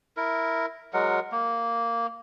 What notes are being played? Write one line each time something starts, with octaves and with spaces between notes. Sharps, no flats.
E4 A#4
F#3 G#3 A#4 F#5
A#3